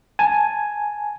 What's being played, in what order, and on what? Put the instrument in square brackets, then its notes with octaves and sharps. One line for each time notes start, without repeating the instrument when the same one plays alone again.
[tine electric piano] G#5 A5